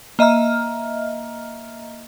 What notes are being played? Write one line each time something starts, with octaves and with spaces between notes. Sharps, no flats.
A#3 D#5 E5 A#5 F6